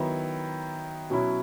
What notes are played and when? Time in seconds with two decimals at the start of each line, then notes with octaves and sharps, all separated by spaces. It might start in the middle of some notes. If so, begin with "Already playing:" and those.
Already playing: D#3 F#3 B3 E4
1.10 B2 F#3 C#4 E4